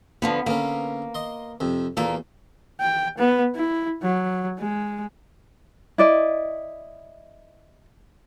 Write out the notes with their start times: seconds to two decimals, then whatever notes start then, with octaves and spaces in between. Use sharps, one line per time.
0.22 D3 F3 B3
0.46 D3 A#3 B3 C#4
1.15 D#5 C6
1.60 F2 C3
1.97 E2 A#2 A#3 A4
2.80 G5
3.18 B3
3.55 E4
4.02 F#3
4.59 G#3
5.98 E4 D5 D#5